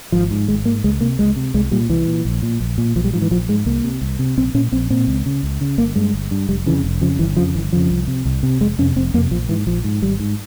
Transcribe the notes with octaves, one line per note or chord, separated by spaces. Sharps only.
G#1 F3
G#2
G#1 G#3
G#2 A#3
C#2 G#3
C3 A#3
C#2 G#3
C3
C2 G#3
A#2 G3
C2 E3
A#2
A#1
A#2
A#1
A#2
A#1 F3
G3
G#2 F3
E3
A#1 F3
G#2 G#3
C2 A#3
C3
C2
C3
A#1 C4
A#2 C#4
A#1 C4
A#2 C4
C#2
C#3
C#2
C#3
G1 A#3
G2 G#3
G1
G2
F1 G3
F2 C#3 E3
F1
F2 C#3 F3
G1 E3
F2 C#3 F3
G1 E3
F2 C#3 F3
C2
C3
C2
C3
F1 G#3
F2 C3 C#4
F1 C4
F2 C3 A#3
A#1 F3
G#2 E3
A#1 F3
G#2
G#1 G3
G#2